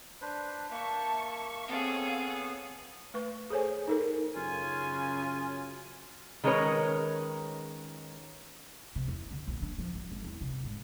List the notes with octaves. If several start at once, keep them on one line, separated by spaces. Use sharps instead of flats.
D4 B4 C5
A#3 E5 A5 C#6
B3 C4 G#4 A4 C#5 F5
A3 B4 C#6
G#4 A4 C5 C#5 G#5
D#4 A4 A#4
F#2 C#3 F4 G#5
D#3 G#3 C#4 A#4 B4 C#5
C3
E2
D3
A#1
D4
F3
E3
G#1
E2
C3
G#2